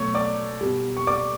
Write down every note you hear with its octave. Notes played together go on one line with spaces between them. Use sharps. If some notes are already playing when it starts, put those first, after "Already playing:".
Already playing: B2 F#3 A3 C#5 C#6
D5 D6
B2 G3
C#6
D5 D6